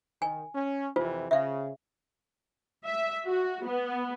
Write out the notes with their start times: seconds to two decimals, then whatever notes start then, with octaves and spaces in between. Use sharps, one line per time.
0.22 D#3 G#5
0.55 C#4
0.96 F2 C3 E3 F4 C5
1.31 C#3 E5 F5
2.85 E5
3.26 F#4
3.66 B3